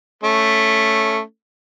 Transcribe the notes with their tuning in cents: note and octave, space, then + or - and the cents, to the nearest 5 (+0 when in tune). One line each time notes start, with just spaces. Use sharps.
A3 +0 C#4 +0